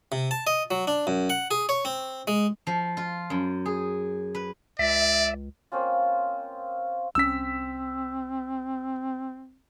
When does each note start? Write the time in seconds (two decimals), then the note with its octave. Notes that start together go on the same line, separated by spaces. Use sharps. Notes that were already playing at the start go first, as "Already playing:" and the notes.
0.12 C3
0.31 A5
0.47 D#5
0.71 F#3
0.87 D4
1.07 F#2
1.30 F#5
1.51 G#4
1.69 C#5
1.85 C4
2.27 G#3
2.67 F3
2.97 F4
3.30 F#2
3.66 G#4
4.35 B4
4.79 C#2 D5 E5
5.72 A#3 C4 C#4 F4
7.15 C2 C4 C#4 E6 B6